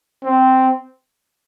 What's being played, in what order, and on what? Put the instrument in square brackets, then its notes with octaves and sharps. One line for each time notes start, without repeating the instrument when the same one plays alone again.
[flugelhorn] C4